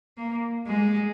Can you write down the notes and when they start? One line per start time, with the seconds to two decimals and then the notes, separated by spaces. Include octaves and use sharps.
0.18 A#3
0.67 G#3